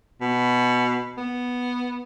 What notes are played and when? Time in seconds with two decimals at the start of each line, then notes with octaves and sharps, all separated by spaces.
0.21 B2
1.17 B3